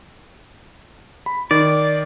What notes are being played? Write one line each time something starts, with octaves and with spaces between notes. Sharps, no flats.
B5
D#3 D5